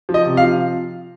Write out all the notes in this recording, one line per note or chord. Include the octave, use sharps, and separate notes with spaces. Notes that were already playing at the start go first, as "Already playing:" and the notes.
F3
D#5
C3
F5
F3